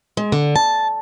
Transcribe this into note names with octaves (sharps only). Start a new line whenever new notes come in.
G#3
D3
A5